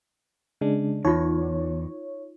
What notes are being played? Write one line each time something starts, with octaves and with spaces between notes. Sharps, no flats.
C#3 G#3 D4
E2 D#4 F4 C#5